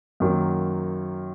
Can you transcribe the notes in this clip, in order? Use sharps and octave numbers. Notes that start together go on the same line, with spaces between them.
F#2 D#3 F#3 A#3